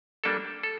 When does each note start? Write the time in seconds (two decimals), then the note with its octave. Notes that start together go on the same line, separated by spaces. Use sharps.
0.24 G3 A#3 D4 A4
0.63 A4